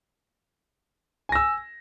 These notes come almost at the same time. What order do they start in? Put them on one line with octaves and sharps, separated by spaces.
G#5 A#6 E6